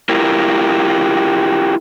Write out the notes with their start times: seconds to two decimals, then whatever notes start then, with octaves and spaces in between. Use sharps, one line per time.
0.09 E4 F4 G4 A#4